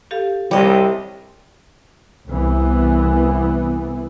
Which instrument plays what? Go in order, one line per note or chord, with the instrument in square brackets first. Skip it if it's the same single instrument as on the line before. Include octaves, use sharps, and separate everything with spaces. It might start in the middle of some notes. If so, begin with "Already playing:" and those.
[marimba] G4 A4 F5
[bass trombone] C2 [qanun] G3 D#5 [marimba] C#5
[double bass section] C2 E3 B3